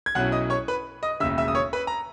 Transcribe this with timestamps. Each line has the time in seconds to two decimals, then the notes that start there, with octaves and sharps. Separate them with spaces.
0.06 G#6
0.15 B1 B2 F#3 C#4 E4 F#5 F#6
0.32 D#5 D#6
0.50 C#5 C#6
0.68 B4 B5
1.03 D#5 D#6
1.20 E1 D#2 C#3 E5 E6
1.38 E5 E6
1.48 D#6
1.55 C#5 C#6
1.73 B4 B5
1.87 A#5